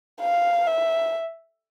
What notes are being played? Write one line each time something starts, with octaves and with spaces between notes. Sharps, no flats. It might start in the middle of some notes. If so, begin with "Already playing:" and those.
F5
E5